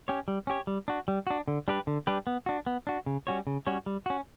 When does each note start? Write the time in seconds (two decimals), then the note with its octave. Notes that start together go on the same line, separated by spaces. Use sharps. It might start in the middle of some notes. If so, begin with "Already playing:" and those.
0.08 C#4 G4 C#5
0.28 G3
0.47 C#4 G4 C#5
0.67 G3
0.88 D4 F#4
1.08 G3
1.27 D4 F#4
1.48 D3
1.68 G3 D4 G4 B4
1.87 D3
2.07 G3 D4 G4 B4
2.27 B3
2.46 D4 F#4
2.66 B3
2.87 D4 F#4
3.06 C#3
3.27 G3 C#4 F#4 C#5
3.47 C#3
3.67 G3 C#4 F#4 C#5
3.86 G3
4.06 C#4 F#4